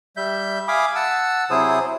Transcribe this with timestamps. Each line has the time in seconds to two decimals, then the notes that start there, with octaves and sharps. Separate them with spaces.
0.17 G3 E5 G6
0.68 E5 F5 G#5 B5 D6 D#6
0.95 F#5 A5 E6
1.50 C3 F#3 E4 G#4 C5 D#6